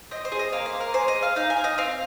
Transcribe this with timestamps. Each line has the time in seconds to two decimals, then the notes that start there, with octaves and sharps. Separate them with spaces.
0.11 C4 D#5
0.25 C5
0.32 G#4
0.39 D#5
0.52 A#3 F5
0.66 C5
0.73 A#3
0.81 A#4
0.94 G#4 C5
1.08 D#5
1.15 G#4
1.22 F5
1.36 D#4 F5
1.50 G#5
1.56 D#4
1.64 D#5
1.78 C4 F5